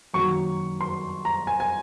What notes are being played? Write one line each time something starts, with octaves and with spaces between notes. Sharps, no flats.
F#2 D#3 F#3 A#3 C#6
C6
A#5
G#5
G#5